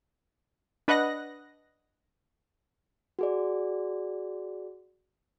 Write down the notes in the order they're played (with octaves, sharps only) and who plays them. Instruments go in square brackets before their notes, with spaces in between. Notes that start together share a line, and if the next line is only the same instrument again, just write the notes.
[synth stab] D4 B4 D#5 F#5 F#6 A#6
[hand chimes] F#4 G#4 D5